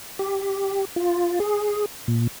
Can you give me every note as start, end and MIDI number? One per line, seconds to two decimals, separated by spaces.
0.19 0.85 67
0.96 1.39 65
1.40 1.86 68
2.08 2.27 46